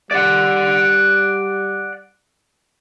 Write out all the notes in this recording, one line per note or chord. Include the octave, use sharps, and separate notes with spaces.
G3 D5 F#5